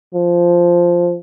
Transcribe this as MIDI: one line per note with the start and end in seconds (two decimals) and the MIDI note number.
0.14 1.17 53